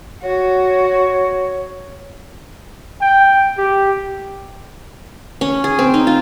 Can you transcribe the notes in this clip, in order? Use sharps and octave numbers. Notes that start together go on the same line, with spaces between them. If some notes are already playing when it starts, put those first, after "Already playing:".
F#4 C#5
G5
G4
C#4
G#4
C4
D#4
F4